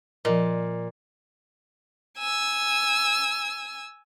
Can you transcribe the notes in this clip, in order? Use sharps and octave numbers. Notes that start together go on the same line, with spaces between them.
A#2 F3 D#5
G#5 E6